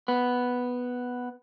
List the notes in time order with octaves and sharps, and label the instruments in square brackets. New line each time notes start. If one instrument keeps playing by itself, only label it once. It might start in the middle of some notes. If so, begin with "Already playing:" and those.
[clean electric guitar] B3